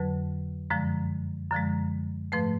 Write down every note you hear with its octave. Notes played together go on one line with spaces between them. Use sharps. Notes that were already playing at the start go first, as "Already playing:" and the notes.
Already playing: F2 D3 F#3 B4
F#2 D3 F3 G#3
F#2 D3 F3 G#3
G#2 F3 A3 B4